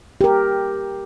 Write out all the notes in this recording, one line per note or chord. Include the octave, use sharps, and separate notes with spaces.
G4 A#4